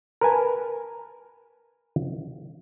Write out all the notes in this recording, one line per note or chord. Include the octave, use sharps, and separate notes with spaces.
A#4 B4 G#5 A5